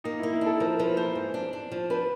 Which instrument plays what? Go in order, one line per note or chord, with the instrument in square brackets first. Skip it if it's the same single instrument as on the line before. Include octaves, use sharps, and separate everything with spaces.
[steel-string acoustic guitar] A#3 [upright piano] D#4
[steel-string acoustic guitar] A#3 [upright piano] E4
[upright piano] E4
[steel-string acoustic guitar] D4 [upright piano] A4
[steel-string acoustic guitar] F3 [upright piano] A#4
[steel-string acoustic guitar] F3 [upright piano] B4
[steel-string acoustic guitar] A#3 [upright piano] C5
[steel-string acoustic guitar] G#2
D4
D4
F3
[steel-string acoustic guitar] D4 [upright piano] B4